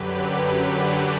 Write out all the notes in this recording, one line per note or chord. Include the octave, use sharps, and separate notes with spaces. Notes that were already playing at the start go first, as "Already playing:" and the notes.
Already playing: F#2 D3 F#3 G4 B4
D4 F#4